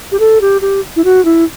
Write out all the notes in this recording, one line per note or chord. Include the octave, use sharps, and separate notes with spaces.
G4
A4
G4
G4
E4
F#4
E4